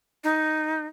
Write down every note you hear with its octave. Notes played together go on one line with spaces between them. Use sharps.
D#4